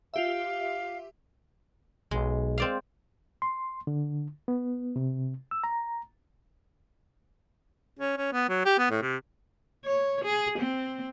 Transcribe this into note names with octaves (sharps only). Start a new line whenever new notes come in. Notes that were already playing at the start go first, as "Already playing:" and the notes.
F4 G4 E5 F5
B1 G#3
C4 D5 F5
C6
D3
B3
C3
E6
A#5
C#4
C#4
B3
F#3
G4
B3
A2
C3
C#5
G#4
C4